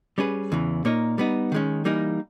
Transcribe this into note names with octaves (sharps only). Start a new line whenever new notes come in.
G3 C#4 G#4 B4
E2 C#3 E3
A#2 A#3 D#4 A#4 C#5
G3 B3 D#4
D#3 G#3 C#4
E3 G3 A#3 D#4 A#4